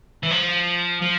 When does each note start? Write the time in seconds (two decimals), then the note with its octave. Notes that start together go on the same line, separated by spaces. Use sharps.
0.23 E3
0.31 F3
1.02 F3